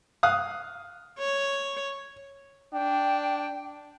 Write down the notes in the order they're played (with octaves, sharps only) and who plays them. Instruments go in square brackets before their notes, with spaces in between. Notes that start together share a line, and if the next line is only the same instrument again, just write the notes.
[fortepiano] F5 D#6 F#6
[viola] C#5
[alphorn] D4 [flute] G5